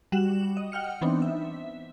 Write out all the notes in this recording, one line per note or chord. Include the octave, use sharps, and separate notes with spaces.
G3 F#4 E7 F#7
D#5
F#5 G5 F6 C#7
E3 B3 C4 D4 D#4
E5